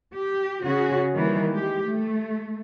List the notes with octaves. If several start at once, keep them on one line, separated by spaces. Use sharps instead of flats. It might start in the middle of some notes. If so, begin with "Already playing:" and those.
G4
C#3 C#4 F#4 G#4
D#3 E3 G3 A#3
G#3 G4
A3